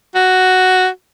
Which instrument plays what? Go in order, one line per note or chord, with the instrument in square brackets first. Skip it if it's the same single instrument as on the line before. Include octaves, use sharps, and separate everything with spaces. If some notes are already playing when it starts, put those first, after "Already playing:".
[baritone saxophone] F#4